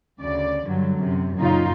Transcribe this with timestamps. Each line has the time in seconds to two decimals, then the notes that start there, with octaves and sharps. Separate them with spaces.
0.21 D2 C#3 D5
0.67 G2 D3 F#3
0.98 F#2 C3
1.38 F#2 A#2 C#3 D#4 F4